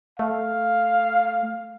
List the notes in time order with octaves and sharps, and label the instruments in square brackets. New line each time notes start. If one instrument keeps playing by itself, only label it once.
[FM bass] A3 [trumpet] F5